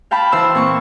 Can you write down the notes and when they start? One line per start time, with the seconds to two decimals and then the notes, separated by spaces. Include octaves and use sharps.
0.11 F5 G5 A5 B5
0.32 E3 C5 A5 E6
0.55 A#2 C4 C#6